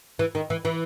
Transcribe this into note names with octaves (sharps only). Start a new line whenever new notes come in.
E3
D#3
E3
E3